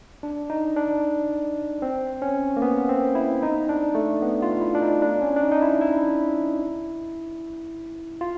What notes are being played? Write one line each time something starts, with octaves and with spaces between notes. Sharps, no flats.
D4
D#4
D4
C4
C#4
A#3
B3
C4
E4
D#4
D4
A3
B3
F4
E4
D4
D#4
D4
C#4
D4
D#4
D#4
E4
E4
F4